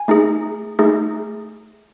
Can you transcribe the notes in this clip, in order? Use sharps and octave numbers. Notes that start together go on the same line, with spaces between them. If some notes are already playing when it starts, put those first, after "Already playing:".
Already playing: G#5
A3 D#4 G#4
A3 D#4 G#4